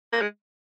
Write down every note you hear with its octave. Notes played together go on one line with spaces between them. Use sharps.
A#3
G#3